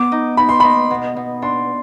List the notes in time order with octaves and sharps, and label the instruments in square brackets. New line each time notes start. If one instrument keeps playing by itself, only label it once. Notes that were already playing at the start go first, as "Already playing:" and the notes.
Already playing: [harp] B3 [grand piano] D6
[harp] D#4
[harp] D#4 [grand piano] B5
[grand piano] C6
[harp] D#4 [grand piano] B5
[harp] B2
B2
[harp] D4 [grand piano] C6